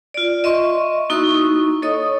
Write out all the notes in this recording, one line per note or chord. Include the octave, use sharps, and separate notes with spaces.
F4 D5
D#5 E5 C6 C#6
A#3 D#4 E4 F#4 C#6 D#6
A4 C#5 D#5 C#6 D#6